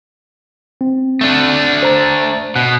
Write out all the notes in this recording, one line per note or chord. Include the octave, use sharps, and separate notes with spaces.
C4
A3 D4
C5 A#5 A6
B2 F#6